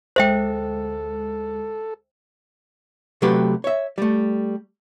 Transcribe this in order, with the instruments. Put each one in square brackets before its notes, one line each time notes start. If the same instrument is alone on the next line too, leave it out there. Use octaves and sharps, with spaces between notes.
[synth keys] D2 G#3 [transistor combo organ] A4 [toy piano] C5 E5 G5
[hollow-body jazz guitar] C3 F#3 A3 F#4 G4 B4
C#5 E5
G3 A3